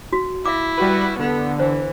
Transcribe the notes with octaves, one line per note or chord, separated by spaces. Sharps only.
F#4
E4 E5 F5 D6
G3 F#4 B4
D3 B3
E3 C5